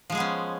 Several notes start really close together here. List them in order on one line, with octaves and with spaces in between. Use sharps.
F3 G#3 G#4 B3 C#4